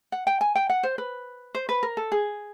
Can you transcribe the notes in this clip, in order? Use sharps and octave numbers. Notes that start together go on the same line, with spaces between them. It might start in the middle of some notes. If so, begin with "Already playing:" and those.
F#5
G5
G#5
G5
F#5
C5
B4
C5
B4
A#4
A4
G#4